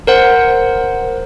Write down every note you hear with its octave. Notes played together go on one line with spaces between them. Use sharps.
A#4 C5 F#5